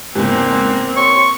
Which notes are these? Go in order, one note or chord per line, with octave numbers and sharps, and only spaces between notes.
F#1 E2 G#2 A#3 C4
C#5 C6 C#6